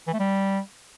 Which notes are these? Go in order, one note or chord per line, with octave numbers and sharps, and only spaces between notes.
E3
A3
G3